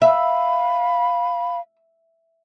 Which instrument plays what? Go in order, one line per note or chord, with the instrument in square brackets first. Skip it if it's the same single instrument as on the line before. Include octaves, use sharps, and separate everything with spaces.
[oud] E5 [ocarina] F5 [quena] B5